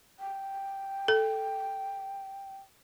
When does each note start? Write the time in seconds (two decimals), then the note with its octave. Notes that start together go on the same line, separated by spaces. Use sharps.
0.19 G5
1.08 A4